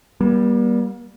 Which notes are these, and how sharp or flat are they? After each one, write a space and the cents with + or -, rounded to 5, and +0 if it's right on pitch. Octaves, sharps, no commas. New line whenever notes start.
G3 +0 A#3 +45